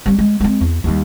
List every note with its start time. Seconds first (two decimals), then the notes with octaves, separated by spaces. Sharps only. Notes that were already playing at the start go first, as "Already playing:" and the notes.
0.06 G3 C#4
0.19 G#3
0.41 G#3 C4
0.61 E2
0.84 D#2 G3